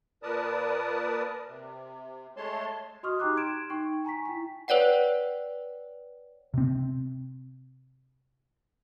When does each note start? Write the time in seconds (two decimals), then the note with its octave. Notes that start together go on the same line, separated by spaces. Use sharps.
0.23 A#2 A#4 B4 D5 A5 D#6
1.48 C3
2.37 G#3 A3 C#5 A5 C6
3.03 F#4 D#5 C6 C#6 D#6 F6
3.19 D#4 G4 G5 A#5 D6 F#6
3.36 C6 G#6 D7 E7
3.70 D#4 G5 C#6
4.05 G#5 A#5 C#6 B6
4.25 E4 G5 B6
4.68 B4 C#5 D5 F#5 G5
6.54 C3 C4